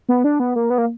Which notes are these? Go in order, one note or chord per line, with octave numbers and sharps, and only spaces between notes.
B3
D4
B3
A#3
B3
A#3